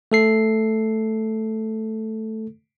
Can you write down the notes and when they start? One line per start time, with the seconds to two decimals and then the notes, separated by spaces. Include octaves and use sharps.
0.12 A3 A4 C7